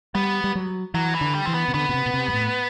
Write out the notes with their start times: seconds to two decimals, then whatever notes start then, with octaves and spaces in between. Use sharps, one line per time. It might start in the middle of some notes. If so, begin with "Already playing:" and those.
0.15 G3 B3
0.44 G3
0.55 F#3
0.94 E3 F#3
1.15 E3
1.21 D3
1.35 G3
1.46 E3 C4
1.54 B3
1.68 C3
1.74 D3 B3
1.89 B2
1.94 C3
2.06 B2
2.14 C3
2.28 G2
2.33 A2